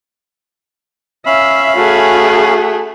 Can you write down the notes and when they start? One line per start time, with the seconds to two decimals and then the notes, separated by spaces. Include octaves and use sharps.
1.26 C#4 E5 F5 B5
1.77 A3 F#4 G#4